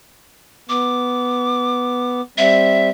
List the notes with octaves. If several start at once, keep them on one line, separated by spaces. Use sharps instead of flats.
B3 D6
G3 C4 E5